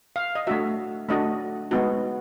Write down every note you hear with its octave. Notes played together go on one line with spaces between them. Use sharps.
F5
D#5
A3 D4 F#4 E5
A3 D4 F#4 D#5
G#3 B3 D#4 F#4